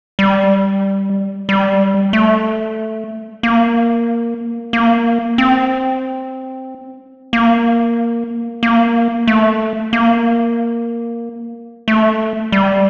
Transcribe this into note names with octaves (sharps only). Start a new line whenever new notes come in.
G3
G3
A3
A#3
A#3
C4
A#3
A#3
A3
A#3
A3
G3